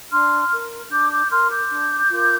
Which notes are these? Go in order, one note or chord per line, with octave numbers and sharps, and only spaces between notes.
D4 C6 F6
A#4
D4 D6 G6
D6 G6
A#4 C6 F6
D6 G6
D4
F4 A#4